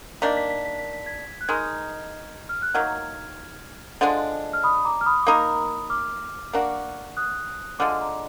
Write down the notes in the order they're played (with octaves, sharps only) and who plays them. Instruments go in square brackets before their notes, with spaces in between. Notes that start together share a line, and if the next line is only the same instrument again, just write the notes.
[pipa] D#3 A#3 D4 [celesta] B6
[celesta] B6
B6
B6
B6
B6
G#6 B6
F#6
[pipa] D#3 G#3 D#4 [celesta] F6 G#6
[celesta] F6
F#6
[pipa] D#3 F#3 A#3 [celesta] F6 G#6
[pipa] D3 F3 G#3 D4
[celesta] F6
B5 D#6
A#5 D6
F6
B5 D#6
D6
[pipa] A#3 D#4 A#4 [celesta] B5 D#6
[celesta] D6 F6
[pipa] A#3 D4 F#4
[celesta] D#6 F#6
[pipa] D3 F3 G#3 [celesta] D6 F6
[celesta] A#5 D6